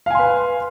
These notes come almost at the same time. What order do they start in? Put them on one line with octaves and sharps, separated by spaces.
F5 G#5 C6 B4